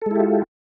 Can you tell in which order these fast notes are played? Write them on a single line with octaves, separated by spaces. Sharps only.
A4 G#3 E4 G4 F4